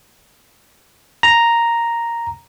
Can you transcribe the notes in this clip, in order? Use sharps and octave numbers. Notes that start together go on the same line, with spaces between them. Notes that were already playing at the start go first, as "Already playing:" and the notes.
A#5